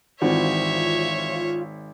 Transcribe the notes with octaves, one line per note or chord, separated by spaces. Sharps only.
G#1 E3 C4 F4 F#4 C#5 E5